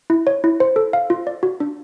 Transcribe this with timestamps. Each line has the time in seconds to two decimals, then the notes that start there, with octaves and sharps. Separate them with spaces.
0.10 E4
0.27 C#5
0.44 E4
0.60 C5
0.76 A4
0.93 F5
1.10 F4
1.27 D5
1.43 F#4
1.60 D4